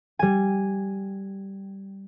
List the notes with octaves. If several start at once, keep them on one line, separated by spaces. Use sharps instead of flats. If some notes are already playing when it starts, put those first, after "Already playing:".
G3 G#5